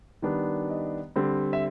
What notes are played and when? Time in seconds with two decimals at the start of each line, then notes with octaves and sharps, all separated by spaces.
0.22 D#3 G3 B3 D4
0.70 D#5
1.16 D3 G3 C4
1.53 E5